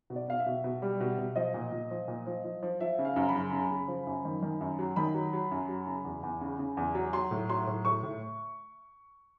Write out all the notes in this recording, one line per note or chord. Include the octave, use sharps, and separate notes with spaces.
B2
D5
B2 F5
E5
B2
B2
G3
B2
B2
F3 D#5
A#2
A#2
F3
A#2
F3
F3
F3
F3 E5
C#3
F5
F#2
B5
C#3
C#3
C#3
F3
F#2
D#3
D#3
F#2
F#3
D#3 B5
F#3
F#3
F#2
F#3
C#3
E2
E2
C#3
C#3
E2
F#3
F#3 C6
A2
F#3 C6
A2
A2 C#6
A2